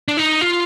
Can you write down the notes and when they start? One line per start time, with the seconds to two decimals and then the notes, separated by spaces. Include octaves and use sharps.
0.08 D4
0.17 D#4
0.41 F4